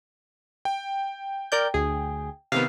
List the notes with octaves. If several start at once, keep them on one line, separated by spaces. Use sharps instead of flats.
G5
A#4 D5 G6
D2 G#4
C3 D#3 B3 F5